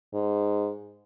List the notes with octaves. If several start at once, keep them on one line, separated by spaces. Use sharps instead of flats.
G#2